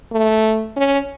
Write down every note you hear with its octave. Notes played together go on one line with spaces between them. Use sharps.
A3
C#4